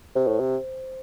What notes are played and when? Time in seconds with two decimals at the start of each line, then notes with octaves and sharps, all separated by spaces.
0.15 C3 C5
0.27 A2
0.40 C3